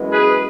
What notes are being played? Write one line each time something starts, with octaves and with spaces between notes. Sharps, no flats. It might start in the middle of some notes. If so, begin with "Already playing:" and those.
Already playing: F#2 E3 G#3 B3
G#4 B4